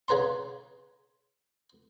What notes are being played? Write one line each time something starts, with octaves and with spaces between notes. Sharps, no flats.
C#3 G#4 B4 A#5 C6